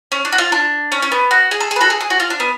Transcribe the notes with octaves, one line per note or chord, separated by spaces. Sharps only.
C#4
D4
F#4
F4
D4
C#4
C#4
B3
F#4
G#4
A4
G#4
B4
F#4 A4
G#4
G#4
F#4
F4
D4
B3